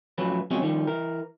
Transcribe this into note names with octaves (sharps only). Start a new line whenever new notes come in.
A2 F3 F#3 C#4 B4
B2 F3 F#3 G#3 C4 C#4
D#3 F3 G3
E3 A#4